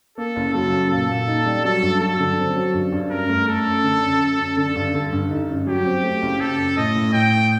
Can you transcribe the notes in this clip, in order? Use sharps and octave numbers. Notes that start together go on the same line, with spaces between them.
A#3 A4
F#1
F#3 A4
F#2
A#2 A4
A#2
D#4
G3
F#3 A4
G2
F#3 A4
D3
C4
F#3
G2
G2
F#2 A#4
A3
A3 A4
F#2
D3
F#2
F#2
F#2
D3 A4
G2
D3
G2
D#4
F#2
F#3 G4
C4
A3
F#1
F#2 A4
F#2
A2 D#5
A2
A2 G5
A2